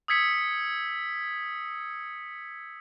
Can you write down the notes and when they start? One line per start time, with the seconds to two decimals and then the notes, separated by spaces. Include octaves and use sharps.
0.08 D#6 E6 G#6 B6 C#7